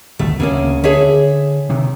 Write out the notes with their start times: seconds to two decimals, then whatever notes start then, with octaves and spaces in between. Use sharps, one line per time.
0.19 D#1 G#1 D2 A3
0.40 D2 C#3 A#3 C#4
0.84 D3 G#4 C#5 E5
1.69 C3 D#3